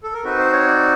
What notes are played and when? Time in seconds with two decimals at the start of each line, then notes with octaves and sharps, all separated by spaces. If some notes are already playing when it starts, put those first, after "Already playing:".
0.03 A4
0.13 A#4
0.24 C4 D#4 F#4 B4
0.39 C5
0.53 C#5
0.67 D5